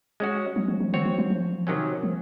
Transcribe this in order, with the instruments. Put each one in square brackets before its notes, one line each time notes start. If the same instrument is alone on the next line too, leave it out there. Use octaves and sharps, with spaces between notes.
[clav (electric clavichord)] G#3 C#4 F#4
[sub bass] F#3
F3
F3
[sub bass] D#3 [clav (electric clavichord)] C4 F#4 C#5
[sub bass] F3
F#3
F3
[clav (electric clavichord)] C3 D#3 F#3 C#4
[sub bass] F3